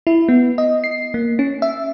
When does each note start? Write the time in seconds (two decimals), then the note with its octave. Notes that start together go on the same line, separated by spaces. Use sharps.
0.07 E4
0.28 B3
0.58 D#5
0.84 C7
1.14 A#3
1.39 C#4
1.62 E5